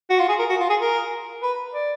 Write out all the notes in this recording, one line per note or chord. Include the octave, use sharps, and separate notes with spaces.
F#4
F4
G#4
A#4
F#4
F4
G#4
A#4
B4
D5